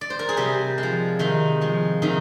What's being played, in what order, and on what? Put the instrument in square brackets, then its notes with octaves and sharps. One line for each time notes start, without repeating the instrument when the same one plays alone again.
[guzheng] D5
C5
A#4
G#4
C3 G3 G4
G#3
F3
C3 D#3 D#4
F3 G#3
C3 D#3 D#4